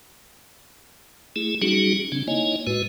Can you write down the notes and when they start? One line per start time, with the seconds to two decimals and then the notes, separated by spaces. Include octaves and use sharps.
1.36 A3 E4 G#4
1.62 F#3 G3 C#4 D#4 F#4 G#4
2.12 C#3 C4 D4
2.28 A#3 D#4 E4 C#5 D#5 G#5
2.67 A2 G#3 F#4 B4